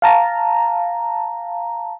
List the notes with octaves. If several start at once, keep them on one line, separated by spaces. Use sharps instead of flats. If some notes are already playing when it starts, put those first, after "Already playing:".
F5 A5 A#5